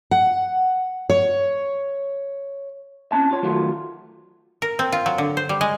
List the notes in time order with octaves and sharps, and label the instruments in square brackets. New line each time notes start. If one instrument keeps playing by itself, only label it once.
[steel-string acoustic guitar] F#5
C#5
[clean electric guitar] C4 C#4 A5
F4 C#5
D#3 F#3 A3 F4
[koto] A#4
C4
F4
F#3
D3
C5
G3
G#3